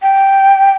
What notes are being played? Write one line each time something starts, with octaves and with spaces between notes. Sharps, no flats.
G5